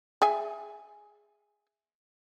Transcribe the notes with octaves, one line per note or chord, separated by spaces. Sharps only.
G#4 E5 G#5